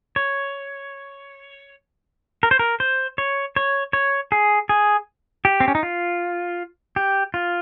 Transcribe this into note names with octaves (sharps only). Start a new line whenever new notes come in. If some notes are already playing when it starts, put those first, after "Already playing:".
C#5
A#4
C5
A#4
C5
C#5
C#5
C#5
G#4
G#4
G4
C4
C#4
D#4
F4
G4
F4